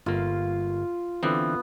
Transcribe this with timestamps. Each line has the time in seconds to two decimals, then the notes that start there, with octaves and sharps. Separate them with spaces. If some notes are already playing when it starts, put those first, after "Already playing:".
0.06 G1 A#3 F4
1.23 D3 E3 B3 C4